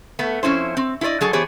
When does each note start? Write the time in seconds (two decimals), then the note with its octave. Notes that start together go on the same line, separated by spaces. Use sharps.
0.19 A3 B3
0.43 F2 C#4 E4 C5
0.77 C4
1.01 E4 G4 C5 D5 D#5
1.21 F#3 G#4 A4
1.33 E3 B3 G4 G#4 C5 C#5